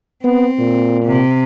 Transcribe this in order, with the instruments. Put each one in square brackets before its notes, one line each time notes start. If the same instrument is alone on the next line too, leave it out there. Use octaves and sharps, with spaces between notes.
[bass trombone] B3 [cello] C4
[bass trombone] A#2
[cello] C3